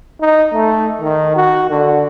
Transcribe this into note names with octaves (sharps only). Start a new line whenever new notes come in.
D#4
A3
D#3
F#4
D3